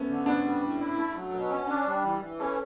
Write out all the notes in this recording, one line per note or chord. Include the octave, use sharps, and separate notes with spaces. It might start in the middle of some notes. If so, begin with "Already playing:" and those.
Already playing: A3 B3 C#4
D3
B3 D4
G3
A2
E4
A3
F#3
B2
C#4
D4
G3
E3
E3
C#4 A4